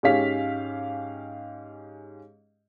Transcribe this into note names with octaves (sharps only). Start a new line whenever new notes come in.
G#2 C#4 G4 C#5 F5 B6